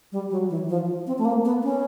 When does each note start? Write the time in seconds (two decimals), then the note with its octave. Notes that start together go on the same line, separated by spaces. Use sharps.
0.12 G3
0.31 F#3
0.50 E3
0.69 F3
1.07 C4
1.18 A3
1.25 A#3
1.45 B3
1.63 C#4